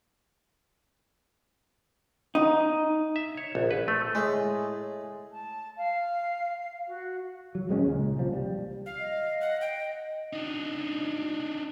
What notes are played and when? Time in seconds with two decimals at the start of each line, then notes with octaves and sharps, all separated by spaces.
2.35 D#4
3.16 E5
3.37 C#5
3.55 A#1
3.71 B4
3.88 A3
4.15 A2 G#3
5.32 A5
5.78 F5
6.88 F#4
7.55 F#3
7.69 D#1 G#3 C4 C#4
7.86 C#2 A#2
8.18 C2 F3
8.33 G3
8.86 F5
8.99 D#5
9.41 F#5
9.61 G5
10.33 D4 D#4